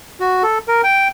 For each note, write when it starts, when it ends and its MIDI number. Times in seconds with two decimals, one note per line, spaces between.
0.20 0.43 66
0.43 0.58 69
0.68 0.81 70
0.83 1.08 79